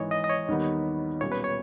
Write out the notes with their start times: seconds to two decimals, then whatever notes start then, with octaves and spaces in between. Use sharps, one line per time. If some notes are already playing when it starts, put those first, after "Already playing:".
Already playing: G#1 G#2 E3 C#5 D#5
0.11 D#5
0.24 D#5
0.30 C#5
0.48 D#2 D#3 G3 B3 D#4
1.21 B1 A#2 G3 C#4 C#5
1.32 B4
1.44 C#5